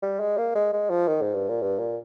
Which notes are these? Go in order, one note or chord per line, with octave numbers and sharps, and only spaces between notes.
G3
G#3
A#3
G#3
G#3
F3
D#3
G#2
G2
A#2
G2
A#2